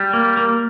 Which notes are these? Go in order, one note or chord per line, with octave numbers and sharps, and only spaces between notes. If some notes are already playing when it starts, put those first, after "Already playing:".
Already playing: G3
A#3
A#3